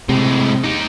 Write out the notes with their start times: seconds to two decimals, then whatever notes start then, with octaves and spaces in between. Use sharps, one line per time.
0.09 A2 C3 G#3
0.64 D#4 G4